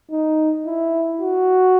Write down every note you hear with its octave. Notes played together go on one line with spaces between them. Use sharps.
D#4
E4
F#4